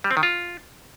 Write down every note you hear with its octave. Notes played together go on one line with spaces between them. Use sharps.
G3
C4
D#3
F4